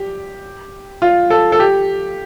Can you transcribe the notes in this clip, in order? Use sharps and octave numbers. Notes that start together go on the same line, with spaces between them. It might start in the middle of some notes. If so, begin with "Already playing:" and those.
Already playing: G4
F4
A4
A4
G4